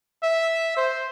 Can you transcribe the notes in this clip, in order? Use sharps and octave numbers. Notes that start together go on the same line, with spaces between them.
E5
C5